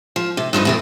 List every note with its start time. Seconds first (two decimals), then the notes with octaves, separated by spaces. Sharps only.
0.16 F3
0.37 C3
0.53 G2 F3 G#3 D#4
0.65 E2 C3 A#4